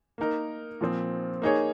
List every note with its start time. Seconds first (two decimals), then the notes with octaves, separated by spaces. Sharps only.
0.18 A#3 D#4 A#4
0.81 A#2 F3 C4
1.42 A#3 D#4 G#4 C#5